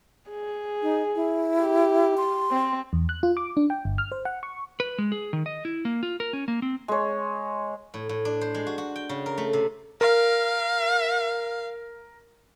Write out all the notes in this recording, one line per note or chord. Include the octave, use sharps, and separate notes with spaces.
G#4
D#4
E4
G4
C6
C4
E2
F#6
F4
D6
D4
G5
G1
F6
C5
F#5
C#6
B4
G#3
G#4
D#3
D#5
E4
A#3
F4
A#4
C#4
A#3
C4
G#3 C#5
A2
A2
D4
C5
G#3
F#4
F#4
G5
C#3
A#4
A3
C3
A#4 F5